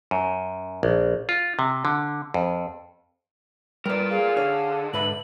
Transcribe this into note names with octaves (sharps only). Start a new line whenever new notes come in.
F#2
A#1
F4
C3
D3
F2
G3 A#4 B4 D5
G#4 F5
D3 C#5
G#2 B4 E5 B5 F#7